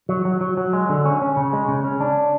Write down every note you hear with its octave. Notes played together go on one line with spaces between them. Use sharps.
F#3
F#3
F#3
F#3
G#3
D3
C#4
C#4
C#3
G#3
C#3
C#4
D4